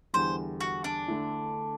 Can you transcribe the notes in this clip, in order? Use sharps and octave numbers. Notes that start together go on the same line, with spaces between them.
E2 D3 G3 C5
F#4
D4
D3 A3 E4